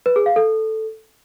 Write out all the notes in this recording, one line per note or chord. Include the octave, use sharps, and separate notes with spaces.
B4
G#4
F5
A4